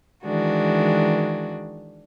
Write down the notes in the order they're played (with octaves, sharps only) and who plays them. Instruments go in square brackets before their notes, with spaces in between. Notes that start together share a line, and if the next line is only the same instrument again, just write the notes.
[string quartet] D#3 E3 G#3 D4 F#4